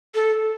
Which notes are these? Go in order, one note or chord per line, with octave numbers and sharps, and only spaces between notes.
A4